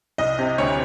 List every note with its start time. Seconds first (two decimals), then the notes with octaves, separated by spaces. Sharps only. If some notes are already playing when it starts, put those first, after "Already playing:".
0.18 C2 D#5
0.39 C3
0.58 D2 C#5